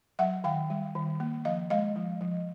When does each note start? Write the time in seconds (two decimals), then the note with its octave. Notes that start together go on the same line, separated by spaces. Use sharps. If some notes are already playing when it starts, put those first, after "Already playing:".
0.19 F#3 E5 F#5
0.44 D#3 F5 G5
0.70 G3
0.95 D#3
1.20 A#3
1.45 F3 D#5 F5
1.70 G#3 D#5 F5
1.96 F3
2.21 F3